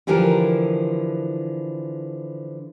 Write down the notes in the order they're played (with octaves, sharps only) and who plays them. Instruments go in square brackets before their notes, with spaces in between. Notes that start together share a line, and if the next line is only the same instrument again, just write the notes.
[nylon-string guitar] D3 E3 F3 G4 A4 A#4